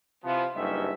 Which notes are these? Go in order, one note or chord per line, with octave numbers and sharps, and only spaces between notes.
C3 E3 F3 B3
F#1 G2 C#4 D#4 G4 E5